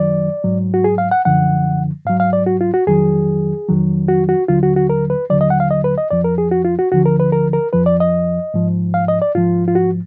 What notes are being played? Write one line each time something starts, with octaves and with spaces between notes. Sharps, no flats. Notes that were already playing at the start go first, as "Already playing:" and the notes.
Already playing: F#2 D#3 F#3 D5
G#2 F#3
F#4
G#4
F5
F#5
F#2 D3 F3 F#5
G#2 F#3 F5
F5
D5
F#4
F4
F#4
F2 D#3 F#3 G#4
F2 D#3 F#3
F#4
F#4
D#2 D3 F#3 F4
F#4
F#4
A#4
B4
D#2 D3 F#3 D5
D#5
F#5
F5
D#5
B4
D#5
F2 F3 D5
A#4
G#4
F#4
F4
F#4
D2 D3 F3 F#4
A#4
B4
A#4
A#4
F2 F3 B4
D5
D#5
G#2 F3
F5
D#5
D5
G#2 F3 F4
F4
F#4